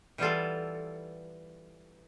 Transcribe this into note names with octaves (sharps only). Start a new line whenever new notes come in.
E3 G3 B3 F4 A4